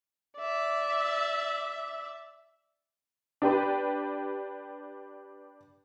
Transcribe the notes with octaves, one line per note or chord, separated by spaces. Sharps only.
D5 E5
D4 G4 B4